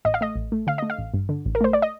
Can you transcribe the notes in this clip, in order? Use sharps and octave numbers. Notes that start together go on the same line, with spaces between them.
A1 D#5
F5
A3 D#5
A1
A3
D3 F5
A3 D#5
F5
A1
G2
D3
A1
A#4
A3 C5
D5
D#5